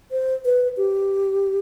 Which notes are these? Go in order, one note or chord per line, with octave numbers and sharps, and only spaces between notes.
C5
B4
G4